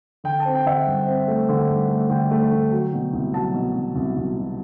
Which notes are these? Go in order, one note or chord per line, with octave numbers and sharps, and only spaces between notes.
D3 G5
A5
C4
G5
D3 E5
F#5
G2
C4
A3
D3
G2
A3
D3 G5
A3
D3
F#3
B2
C2
F#3 A5
B2
B2
C2
C2
B2